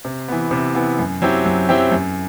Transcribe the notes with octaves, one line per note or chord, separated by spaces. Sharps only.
C3
E3 B3
C3
E3 B3
F#2
F#3 C4 E4 G4
F#2
F#3 C4 E4 G4
F#2